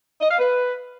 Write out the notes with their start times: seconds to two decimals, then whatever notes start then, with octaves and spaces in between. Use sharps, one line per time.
0.21 D#5
0.30 F5
0.39 B4